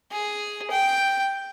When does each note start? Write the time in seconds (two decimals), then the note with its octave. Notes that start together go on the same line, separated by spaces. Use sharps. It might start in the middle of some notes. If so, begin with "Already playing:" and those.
0.12 G#4
0.71 G5